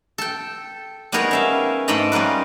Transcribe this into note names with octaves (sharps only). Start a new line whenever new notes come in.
A4 G5
G3 B3 D#4 G#4 A#4 C#5
C#4 E5 F5
G#2 A3 D#4 D5 D#5 B5
G3 C#4 F4 A#4 B4